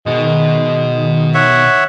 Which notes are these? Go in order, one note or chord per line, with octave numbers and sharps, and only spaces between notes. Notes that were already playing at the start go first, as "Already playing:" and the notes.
B2 D#3 G#3 F#4
C#5 E5 F#5